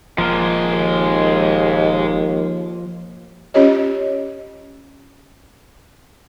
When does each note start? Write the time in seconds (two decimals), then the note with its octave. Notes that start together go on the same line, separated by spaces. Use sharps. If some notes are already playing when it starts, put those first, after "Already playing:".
0.18 D#1 F3 G#3 A#3 A#4
0.72 D#2
3.54 C#4 F4 G4 C#5 D#5